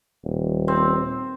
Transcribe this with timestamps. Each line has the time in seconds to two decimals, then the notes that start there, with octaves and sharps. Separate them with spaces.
0.25 D#1
0.68 C4